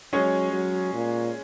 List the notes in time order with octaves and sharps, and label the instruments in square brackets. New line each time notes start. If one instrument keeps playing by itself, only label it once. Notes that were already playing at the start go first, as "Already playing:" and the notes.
[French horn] F#3 [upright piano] G#3 C#4 G#4 C#5
[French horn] F#3
A#2